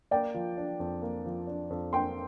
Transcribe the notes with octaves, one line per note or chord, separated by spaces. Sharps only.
A#3 D5 G5
F3
D4
F2
A#3
F3
D4
F2
A#3 G5 C6